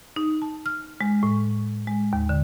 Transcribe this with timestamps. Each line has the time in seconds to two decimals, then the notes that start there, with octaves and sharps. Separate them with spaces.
0.16 D#4
0.42 A5
0.66 F6
1.01 G#3
1.23 A2
1.87 G#3
2.13 D#2
2.29 D3